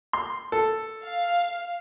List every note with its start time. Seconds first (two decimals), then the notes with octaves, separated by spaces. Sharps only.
0.13 C6
0.52 A4
1.04 F5